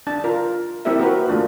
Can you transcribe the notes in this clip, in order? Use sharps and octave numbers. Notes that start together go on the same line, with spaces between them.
D4 A5
F4 A#4
A#3 C4 E4 G4 A#4 E5
F#4 A#4 B4
A3 A#3 D4 F4